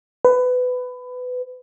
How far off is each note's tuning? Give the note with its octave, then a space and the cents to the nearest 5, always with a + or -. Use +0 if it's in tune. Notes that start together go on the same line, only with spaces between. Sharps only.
B4 +20